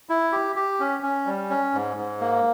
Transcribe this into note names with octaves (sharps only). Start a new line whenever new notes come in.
E4
G4
G4
C#4
C#4
G3
C#4
G#2
G#2
A#3